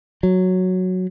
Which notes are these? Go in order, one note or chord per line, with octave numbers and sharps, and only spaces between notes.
F#3